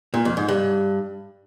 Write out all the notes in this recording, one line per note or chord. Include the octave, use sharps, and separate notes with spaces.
A#2
F2
G#2
G2